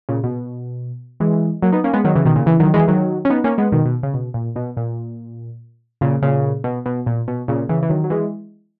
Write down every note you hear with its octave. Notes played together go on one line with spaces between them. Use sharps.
A#2 C#3
B2
E3 G#3
F#3 A#3
B3 D#4
A#3 C#4
G#3 B3
D#3 F#3
C#3 E3
B2 D#3
A#2 C#3
C#3 E3
D#3 F#3
E3 G#3
D#3 F#3
C#4
B3 D#4
A#3 C#4
G#3 B3
B2 D#3
B2
C#3
B2
A#2
B2
A#2
A#2 C#3
A#2 C#3
B2
B2
A#2
B2
A#2 C#3
C#3 E3
E3
D#3 F#3
F#3
E3 G#3